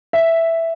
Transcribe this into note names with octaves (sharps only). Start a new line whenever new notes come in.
E5